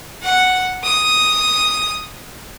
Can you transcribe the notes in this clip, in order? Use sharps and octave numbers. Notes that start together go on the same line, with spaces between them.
F#5
D#6